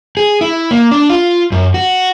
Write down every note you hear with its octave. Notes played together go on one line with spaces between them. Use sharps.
G#4
E4
A#3
D4
F4
F#2
F#4